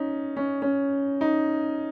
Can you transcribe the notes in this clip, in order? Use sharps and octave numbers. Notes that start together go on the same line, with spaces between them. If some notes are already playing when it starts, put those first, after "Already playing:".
Already playing: C#4 D#4
C#4
C#4
D#4